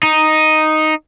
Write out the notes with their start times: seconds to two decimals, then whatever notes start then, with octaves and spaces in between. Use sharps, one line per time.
0.03 D#4